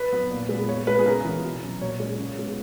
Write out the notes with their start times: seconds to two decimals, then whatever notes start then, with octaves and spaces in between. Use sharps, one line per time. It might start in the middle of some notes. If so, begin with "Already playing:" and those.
Already playing: B4
0.12 F#3 B3
0.30 A#2
0.49 G#3 B3
0.68 A#2 C#5
0.87 G#3 B3 B4
0.99 G#4
1.06 C#3 A#4
1.25 E3 B3
1.43 B2
1.62 F#3 C#4
1.81 A#2 C#5
2.00 G#3 C#4
2.19 C#3
2.37 G#3 B3